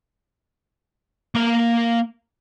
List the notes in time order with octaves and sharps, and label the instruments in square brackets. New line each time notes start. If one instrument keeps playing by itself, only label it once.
[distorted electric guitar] A#3 A#5